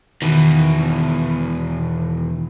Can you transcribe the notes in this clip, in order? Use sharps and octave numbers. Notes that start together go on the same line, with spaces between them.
E2 B2 D#3